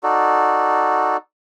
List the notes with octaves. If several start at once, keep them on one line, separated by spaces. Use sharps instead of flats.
D#4 F#4 A4 D5